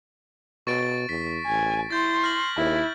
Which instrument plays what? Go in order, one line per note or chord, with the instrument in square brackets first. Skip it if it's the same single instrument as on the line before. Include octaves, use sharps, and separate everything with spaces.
[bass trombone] B2 [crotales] C#6 A6 D7
[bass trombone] E2 [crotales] B6
[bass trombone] A1 [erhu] G#5
[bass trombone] E4 [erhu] C6 [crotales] G6 A6
[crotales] F6 A#6 F#7
[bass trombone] D#2 [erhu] E4